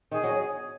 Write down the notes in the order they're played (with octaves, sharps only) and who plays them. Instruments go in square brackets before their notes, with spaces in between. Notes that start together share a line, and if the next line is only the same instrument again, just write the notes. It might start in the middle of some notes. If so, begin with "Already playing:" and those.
[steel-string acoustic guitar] D#3 [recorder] G#4
[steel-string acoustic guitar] F#3